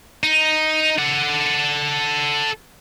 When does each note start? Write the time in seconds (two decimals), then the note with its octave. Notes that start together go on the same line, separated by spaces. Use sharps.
0.23 D#4
0.99 A4 F#5